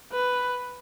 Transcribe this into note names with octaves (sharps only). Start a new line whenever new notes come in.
B4